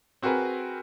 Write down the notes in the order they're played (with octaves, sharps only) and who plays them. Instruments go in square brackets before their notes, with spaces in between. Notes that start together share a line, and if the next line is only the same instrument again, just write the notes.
[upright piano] C4 F#4 G#4 A#4 B4